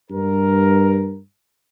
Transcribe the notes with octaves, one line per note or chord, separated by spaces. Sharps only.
G2 A#4